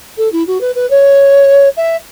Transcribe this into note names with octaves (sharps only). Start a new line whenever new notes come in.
A4
E4
F#4
B4
B4
C#5
E5